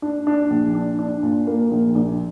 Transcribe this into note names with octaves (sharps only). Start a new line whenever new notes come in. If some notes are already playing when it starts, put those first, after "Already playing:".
D4
D4
A#1
D4
D4
A#2
A#3
A#1
A#1